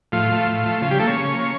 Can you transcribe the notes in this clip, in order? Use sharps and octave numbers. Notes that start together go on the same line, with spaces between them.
A2 F3 F4
F3 A3
A2
F3 A3
C#3 F3 F4
G3 G4
F3 A3 A#3 A4
C#4 C#5
C#3
F3 A#3